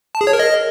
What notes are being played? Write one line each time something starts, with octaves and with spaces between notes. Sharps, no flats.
A5
G#4
C#5
A#4
D#5